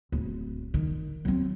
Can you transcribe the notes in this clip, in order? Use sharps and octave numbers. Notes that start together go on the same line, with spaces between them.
D1
D#3
F#3 C4